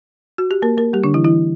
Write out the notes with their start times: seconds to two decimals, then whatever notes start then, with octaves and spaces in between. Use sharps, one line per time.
0.38 F#4
0.51 G4
0.62 A#3 A#4
0.77 A#3 A#4
0.93 G3 G4
1.04 D3 D4
1.14 E3 E4
1.25 E3 E4